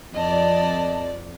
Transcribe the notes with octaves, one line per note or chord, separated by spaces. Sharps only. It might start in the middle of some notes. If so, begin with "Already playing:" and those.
F2 D5 D#5 A5